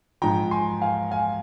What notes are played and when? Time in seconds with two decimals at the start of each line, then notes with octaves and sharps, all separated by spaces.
0.22 G#2 F3 G5 A#5
0.51 G#5 C6
0.81 F5 G#5
1.11 F5 G#5